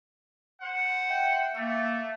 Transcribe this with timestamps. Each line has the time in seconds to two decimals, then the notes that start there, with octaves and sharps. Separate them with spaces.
0.61 C5 F#5
1.10 E5 G5
1.55 A3 A#3 E5